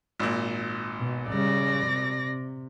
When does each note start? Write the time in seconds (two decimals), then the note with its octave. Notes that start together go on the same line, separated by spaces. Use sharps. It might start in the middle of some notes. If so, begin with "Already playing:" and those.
0.19 G#1 A#2
0.99 B2
1.30 C#3 G3 D5 A#6
1.86 C3